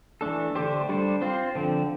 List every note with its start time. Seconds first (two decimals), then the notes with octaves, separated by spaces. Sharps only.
0.21 E3 A3 D4 A4
0.55 D3 A3 D4 G4 C5
0.89 G3 D4 A4 C5
1.22 C4 F4 C5
1.55 D3 F3 C4